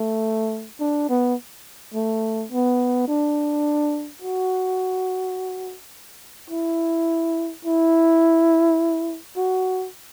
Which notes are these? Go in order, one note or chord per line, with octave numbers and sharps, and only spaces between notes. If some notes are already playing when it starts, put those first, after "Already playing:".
Already playing: A3
D4
B3
A3
B3
D4
F#4
E4
E4
F#4